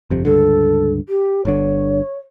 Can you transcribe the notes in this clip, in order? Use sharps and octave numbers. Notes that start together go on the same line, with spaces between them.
G1 F2 C3
C#2 G2 D3 A4
G4
G1 G2 D3 C#5